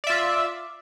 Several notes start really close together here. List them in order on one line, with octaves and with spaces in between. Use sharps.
D5 E5 F4